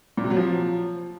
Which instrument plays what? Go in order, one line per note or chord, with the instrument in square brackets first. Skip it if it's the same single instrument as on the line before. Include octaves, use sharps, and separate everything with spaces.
[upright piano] A#2
C3
F#3
F3